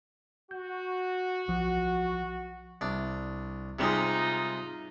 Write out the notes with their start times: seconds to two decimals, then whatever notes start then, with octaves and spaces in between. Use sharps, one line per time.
0.51 F#4 G6
1.48 B1 F3
2.81 C2 D4
3.79 C3 G3 G#3 D#4 F4